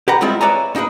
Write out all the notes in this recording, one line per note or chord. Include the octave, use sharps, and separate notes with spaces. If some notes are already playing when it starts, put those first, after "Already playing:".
G4 B4 F#5 A#5
G3 G#3 C4 E4 F4
B4 C#5 D5 E5 G#5 A#5
A#3 D#4 E4 G#4 B4